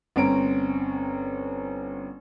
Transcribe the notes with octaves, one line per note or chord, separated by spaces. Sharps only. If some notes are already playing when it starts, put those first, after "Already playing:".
G1 C4 C#4 A#5 D7